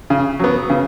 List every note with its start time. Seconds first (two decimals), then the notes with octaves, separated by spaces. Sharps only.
0.10 C#3
0.39 F#3 B3
0.70 C#3